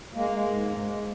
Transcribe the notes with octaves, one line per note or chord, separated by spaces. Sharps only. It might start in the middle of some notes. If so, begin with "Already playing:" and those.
G#3 A#3
G#3
G#2
G#3
G#3